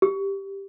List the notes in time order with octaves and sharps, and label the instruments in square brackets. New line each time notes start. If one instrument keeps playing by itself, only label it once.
[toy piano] G4